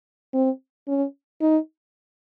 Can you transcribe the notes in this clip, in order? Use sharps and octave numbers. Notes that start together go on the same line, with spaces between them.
C4
C#4
D#4